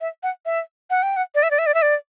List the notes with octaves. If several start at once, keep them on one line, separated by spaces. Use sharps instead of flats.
E5
F#5
E5
F#5
G5
F#5
D5
E5
D5
E5
D5
E5
D5